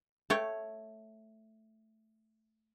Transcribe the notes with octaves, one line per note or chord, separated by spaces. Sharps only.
A3 C#5 G5